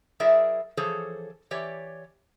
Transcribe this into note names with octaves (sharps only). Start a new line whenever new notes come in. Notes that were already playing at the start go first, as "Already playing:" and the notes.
F#3 E4 G#4 A#4 D5 E5
E3 F3 G#4 A4 C5 C#5
E3 G4 C#5 D5